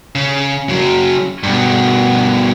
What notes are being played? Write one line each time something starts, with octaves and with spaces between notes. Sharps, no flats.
C#3
C#3 F#3
G2 B2